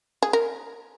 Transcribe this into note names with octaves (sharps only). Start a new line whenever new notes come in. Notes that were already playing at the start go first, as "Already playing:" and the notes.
G#4
A#4